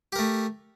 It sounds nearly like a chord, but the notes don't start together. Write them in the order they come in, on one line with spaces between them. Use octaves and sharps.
G4 A#4 A3